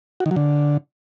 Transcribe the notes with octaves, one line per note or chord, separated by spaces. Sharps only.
F#4
D#3
F#3
D3